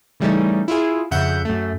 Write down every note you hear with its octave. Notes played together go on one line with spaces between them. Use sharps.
C#3 E3 G3 A3 C#4 D#4
E4 F4 G#4
F2 C#3 E5 F#5 G6
F#2 A3